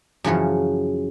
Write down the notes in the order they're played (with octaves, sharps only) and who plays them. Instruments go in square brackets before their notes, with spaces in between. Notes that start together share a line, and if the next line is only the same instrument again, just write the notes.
[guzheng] F#2 C#3 E3 F3 C#5